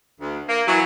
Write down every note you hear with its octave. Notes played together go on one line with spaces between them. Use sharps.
D2
A#3
E3 F#3